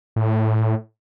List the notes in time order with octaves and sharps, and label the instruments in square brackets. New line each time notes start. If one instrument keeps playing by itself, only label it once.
[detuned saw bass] A2